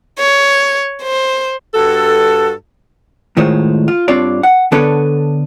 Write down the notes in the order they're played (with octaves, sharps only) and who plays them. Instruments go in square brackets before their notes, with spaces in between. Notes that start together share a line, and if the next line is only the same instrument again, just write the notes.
[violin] C#5
C5
[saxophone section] G2 F#4 A4
[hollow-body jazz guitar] A2 D#3 G#3 F4 C5 C#5
F4
G2 C4 D4 F4 C#5 D5
F#5
D3 B3 D4 A4 B4 C#5